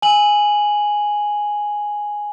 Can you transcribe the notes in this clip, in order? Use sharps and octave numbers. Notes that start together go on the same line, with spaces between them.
G#5 F#7